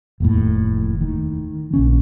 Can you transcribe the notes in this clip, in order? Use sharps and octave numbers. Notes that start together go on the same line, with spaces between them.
F1 D#2 A2
D#3
A#1 D#3 C#4